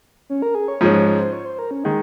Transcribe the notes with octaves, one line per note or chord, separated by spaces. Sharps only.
C#4
A#4
G#4
C#5
G#2 F3 G#3 C#4 C5
C#5
C5
C5
C#5
C5
A#4
C#4
D#3 G#3 D#4